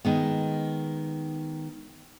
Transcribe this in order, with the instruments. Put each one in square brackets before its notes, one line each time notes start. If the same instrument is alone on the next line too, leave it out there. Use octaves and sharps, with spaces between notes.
[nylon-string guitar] D#3 G#3 B3